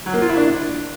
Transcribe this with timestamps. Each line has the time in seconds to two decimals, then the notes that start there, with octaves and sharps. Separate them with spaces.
0.06 F#3
0.14 A#3
0.21 F4
0.29 E4
0.37 D4